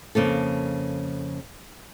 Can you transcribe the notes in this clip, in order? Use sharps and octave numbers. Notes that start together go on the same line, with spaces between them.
F2 C#3 A#3 A4